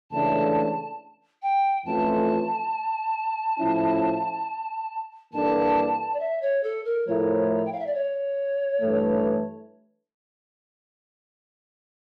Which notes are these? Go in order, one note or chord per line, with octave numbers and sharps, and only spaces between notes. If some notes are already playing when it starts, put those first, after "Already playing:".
C#2 C#3 E3 A3 D4 A5
G5
F2 E3 A3 C#4 F4 A5
A2 F3 C#4 E4
G2 E3 A#3 D4 A4 A5
D5
E5
C#5
A4
A#4
A2 F3 A3 E4 A#4 C#5
G5
F5
E5
D5
C#5
G2 E3 A3